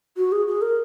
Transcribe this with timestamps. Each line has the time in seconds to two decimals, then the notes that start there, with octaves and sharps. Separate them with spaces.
0.17 F#4
0.32 G#4
0.47 G#4
0.62 A#4